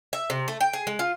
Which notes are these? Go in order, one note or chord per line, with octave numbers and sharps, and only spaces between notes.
E5
C3
A3
G5
G#4
G#3
F4